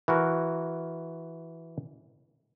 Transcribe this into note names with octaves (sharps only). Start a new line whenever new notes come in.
E3 F#4 A#4